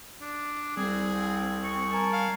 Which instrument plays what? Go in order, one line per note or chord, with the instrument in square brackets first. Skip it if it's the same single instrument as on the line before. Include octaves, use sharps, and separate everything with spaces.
[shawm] D4
[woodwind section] C2 C4 [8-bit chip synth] G3 [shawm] G#4
[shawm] C#6
[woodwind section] A#4 G#5 A5
[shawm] F5